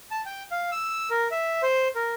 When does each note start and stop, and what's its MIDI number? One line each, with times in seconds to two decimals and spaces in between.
0.11 0.21 81
0.26 0.43 79
0.51 0.70 77
0.72 1.09 88
1.10 1.28 70
1.31 1.61 76
1.63 1.88 72
1.95 2.15 70